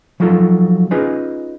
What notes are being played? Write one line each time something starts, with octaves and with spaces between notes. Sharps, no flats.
F3 F#3 D#4 F4 A4
C#4 D#4 F4 G#4 B4 D#5